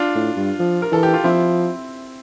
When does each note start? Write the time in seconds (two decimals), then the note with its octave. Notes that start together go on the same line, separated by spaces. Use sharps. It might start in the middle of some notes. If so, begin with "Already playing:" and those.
Already playing: D4 F4
0.15 A2
0.36 G2
0.59 F3
0.82 A#4
0.92 E3 A4
1.03 G4
1.14 F4
1.24 F3 C4 E4